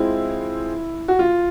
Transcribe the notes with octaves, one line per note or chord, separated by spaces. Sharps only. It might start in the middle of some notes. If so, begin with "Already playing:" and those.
Already playing: G#3 C4 E4 F4 G#4 C5
F#4
F4